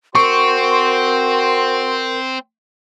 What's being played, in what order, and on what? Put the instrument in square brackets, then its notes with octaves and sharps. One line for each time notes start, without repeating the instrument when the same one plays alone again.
[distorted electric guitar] C4 [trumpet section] F#4 C5 C6 [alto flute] A#4 [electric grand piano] C#6